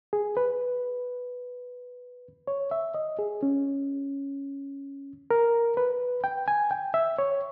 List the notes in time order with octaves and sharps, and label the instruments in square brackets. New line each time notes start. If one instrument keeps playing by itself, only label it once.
[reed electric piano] G#4
B4
C#5
E5
D#5
G#4
C#4
A#4
B4
G5
G#5
G5
E5
C#5